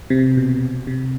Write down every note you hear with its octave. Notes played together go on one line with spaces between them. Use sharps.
C3
B2
C3